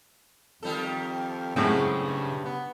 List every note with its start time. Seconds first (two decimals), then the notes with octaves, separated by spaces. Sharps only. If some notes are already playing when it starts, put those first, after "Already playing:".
0.63 F2 D#3 G3 A4
1.56 F#2 A2 C#3 G#3 C4
1.98 G2
2.44 B3